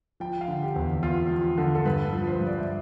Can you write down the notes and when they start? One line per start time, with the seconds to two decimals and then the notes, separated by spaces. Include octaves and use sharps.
0.20 F3 G5
0.41 F5
0.48 D3
0.62 G4
0.76 E2
1.03 E2 F4
1.31 F3
1.57 D3 A4
1.75 A4
1.85 G2 B4
2.13 F3
2.27 C5
2.40 G2
2.47 D5
2.58 E5